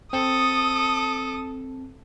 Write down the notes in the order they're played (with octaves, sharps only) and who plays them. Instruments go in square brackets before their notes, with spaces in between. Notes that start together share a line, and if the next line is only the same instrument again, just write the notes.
[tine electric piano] C4 [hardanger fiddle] A4 [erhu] D#6